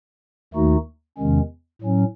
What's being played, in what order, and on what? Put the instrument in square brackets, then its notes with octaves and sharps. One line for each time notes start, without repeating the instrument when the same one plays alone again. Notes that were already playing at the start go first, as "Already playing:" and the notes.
[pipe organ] D#2 D#3 A3 D#4 F#4
E2 C3 D#3 G#3 C#4
A2 F#3 C#4